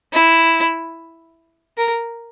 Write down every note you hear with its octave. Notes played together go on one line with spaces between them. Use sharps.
E4
A#4